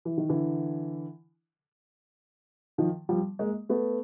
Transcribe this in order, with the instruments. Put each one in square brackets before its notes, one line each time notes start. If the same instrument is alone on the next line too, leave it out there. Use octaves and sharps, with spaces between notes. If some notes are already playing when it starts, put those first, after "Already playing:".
[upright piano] E3
D#3
D3 E3
D#3 F3
F3 G3
G#3 A#3
A3 B3